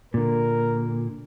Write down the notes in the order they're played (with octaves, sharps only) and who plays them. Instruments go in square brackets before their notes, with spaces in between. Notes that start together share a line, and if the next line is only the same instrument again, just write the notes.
[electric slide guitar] A#2 D3 [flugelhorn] A#4